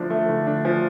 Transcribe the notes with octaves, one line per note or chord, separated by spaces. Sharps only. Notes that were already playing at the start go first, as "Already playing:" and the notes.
Already playing: D3 F3 A3 D4
A3
D3
D4
F3